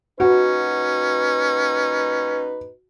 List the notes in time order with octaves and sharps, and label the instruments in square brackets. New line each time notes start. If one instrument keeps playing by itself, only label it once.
[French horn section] A#2 D#4 B4 [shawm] C#4 [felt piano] F#4